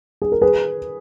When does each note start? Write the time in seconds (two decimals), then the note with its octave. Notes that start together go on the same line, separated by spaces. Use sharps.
0.22 G#4
0.32 A#4
0.42 G#4 B4